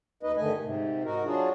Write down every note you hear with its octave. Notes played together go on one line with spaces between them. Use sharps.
D#2 D#4 B4 D#5
G2 D3 D#3 A3 D#5 G#5
G#2 C3
D#4 F#4 A#4
F#3 D4 F4 F#4 G#4